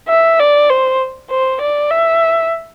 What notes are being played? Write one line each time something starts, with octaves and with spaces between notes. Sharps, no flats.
E5
D5
C5
C5
D5
E5